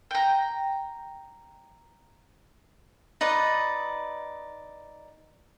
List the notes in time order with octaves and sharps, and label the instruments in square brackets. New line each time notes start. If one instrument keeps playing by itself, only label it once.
[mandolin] G5 A#5
[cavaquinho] D#4 B4 D5 D#5